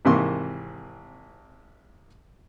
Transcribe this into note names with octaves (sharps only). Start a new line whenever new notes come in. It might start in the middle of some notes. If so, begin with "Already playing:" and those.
G#1 C3 E3 A#3 C6 C#6